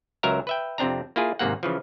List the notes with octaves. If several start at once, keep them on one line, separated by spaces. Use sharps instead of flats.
C#2 F#3 A#4 E5 F5 A#5
B4 E5 G5
F2 C3 C4 D4 A#5
A#3 E4 F4 G#4
G#1 G#2 C3 A#3 F#5
C#3 E3 F3